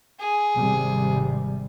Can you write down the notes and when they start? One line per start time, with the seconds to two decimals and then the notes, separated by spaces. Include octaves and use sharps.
0.20 G#4
0.56 G#1 C3 G3